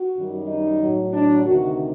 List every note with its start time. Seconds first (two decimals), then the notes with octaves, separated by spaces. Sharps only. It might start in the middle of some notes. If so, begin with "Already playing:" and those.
Already playing: F#4
0.16 F#2 D#3 G3
0.48 D#4
0.81 A2 F#3
1.14 D4
1.46 D2 C3 D#3 F#4